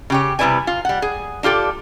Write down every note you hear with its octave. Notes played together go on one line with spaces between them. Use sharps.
C#3 G4 C#5
C3 G3 E4 B4 D5 G#5
F4
G3 F#5
G#4
D4 F4 G4 A4